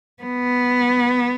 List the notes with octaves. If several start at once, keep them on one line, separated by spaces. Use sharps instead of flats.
B3